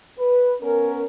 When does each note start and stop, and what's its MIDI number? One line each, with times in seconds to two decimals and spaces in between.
0.19 0.55 71
0.62 1.05 59
0.62 1.05 61
0.62 1.05 70